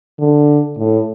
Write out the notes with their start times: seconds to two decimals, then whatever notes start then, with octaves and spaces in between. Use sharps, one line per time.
0.19 D3
0.78 A2